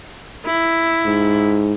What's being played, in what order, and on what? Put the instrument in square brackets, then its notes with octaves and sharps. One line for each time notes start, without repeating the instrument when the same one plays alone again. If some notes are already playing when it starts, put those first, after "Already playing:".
[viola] E4
[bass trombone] G#2